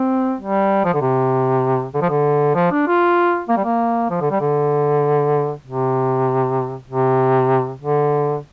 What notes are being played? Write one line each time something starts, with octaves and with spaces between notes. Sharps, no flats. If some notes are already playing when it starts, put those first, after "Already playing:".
Already playing: C4
G3
F3
D3
C3
D3
F3
D3
F3
D4
F4
A#3
G3
A#3
F3
D3
G3
D3
C3
C3
D3